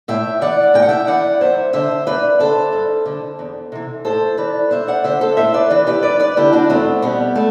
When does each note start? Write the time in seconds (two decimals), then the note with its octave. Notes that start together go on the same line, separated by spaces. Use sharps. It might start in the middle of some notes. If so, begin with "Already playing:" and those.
0.08 A2 E5 G5
0.41 E3 D5 F#5
0.74 A2 G5
0.82 F#5
0.89 E5 G5
1.07 E3 D5 F#5
1.41 F#2 C5 E5
1.73 D3 C5 E5
2.07 F#2 B4 D5
2.39 D3 A4 C5
2.73 G2
3.06 D3
3.39 E2
3.72 C3 E3
4.05 A2 A4 C5
4.37 E3 B4 D5
4.71 G2 C5 E5
4.87 D5 F#5
5.04 D3 C5 E5
5.21 A4 C5
5.37 A2 C5 E5
5.53 B4 D5
5.70 E3 B4 D5
5.87 G4 B4
6.03 F#2 B4 D5
6.19 B4 D5
6.37 D3 E4 G4
6.53 D4 F#4
6.70 E2 A3 C4
7.02 B2 G3 B3
7.36 A3